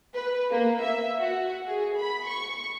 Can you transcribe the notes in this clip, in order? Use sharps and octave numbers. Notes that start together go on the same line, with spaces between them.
B4
A#3
E5
F#4
G#4
B5
C#6